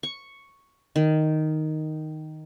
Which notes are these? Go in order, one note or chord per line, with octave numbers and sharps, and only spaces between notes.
C#6
D#3